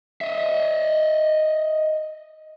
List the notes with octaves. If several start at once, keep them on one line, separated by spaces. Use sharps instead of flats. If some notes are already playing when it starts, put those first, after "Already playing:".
D#5 E5